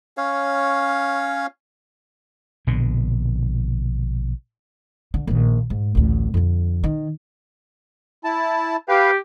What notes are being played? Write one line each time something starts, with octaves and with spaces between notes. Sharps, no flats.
C#4 C#5 F5
A#1 B2 D3
D3
A#1 D#3
G#2
A1 D2
F2 D3
D#3
E4 A5
G4 B4 F5